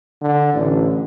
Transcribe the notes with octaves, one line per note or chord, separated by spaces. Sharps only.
D3
A1